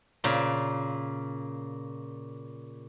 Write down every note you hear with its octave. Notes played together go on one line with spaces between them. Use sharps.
A#2 C#3